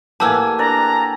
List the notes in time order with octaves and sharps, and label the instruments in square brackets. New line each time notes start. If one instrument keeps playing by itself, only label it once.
[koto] A2 A#3 B4 [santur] G4 F#5 G#5 [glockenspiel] A5 E6
[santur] D4 A#4 D5 [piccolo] A#5